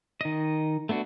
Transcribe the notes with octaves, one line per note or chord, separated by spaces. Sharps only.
D#3 D#5
A3 B3 D4 F#4